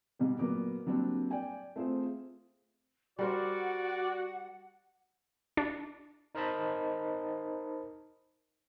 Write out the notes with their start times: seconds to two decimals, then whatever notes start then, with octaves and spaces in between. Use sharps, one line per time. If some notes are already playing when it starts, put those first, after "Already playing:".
0.19 G#2 B2 G3
0.39 A#2 F#3 B3 A#4 D6
0.87 F#3 G3 A#3 C4 D4
1.31 D5 G5 G#5
1.76 A3 C4 F4 G#4 C5
3.19 G3 F#4 A#4 C5 D5 F#5
5.57 D4
6.35 D#4 A#4 C5 D#5 A5 B5